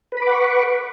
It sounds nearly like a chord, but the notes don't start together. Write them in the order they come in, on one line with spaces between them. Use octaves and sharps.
B4 B5 D6 F#5 C#6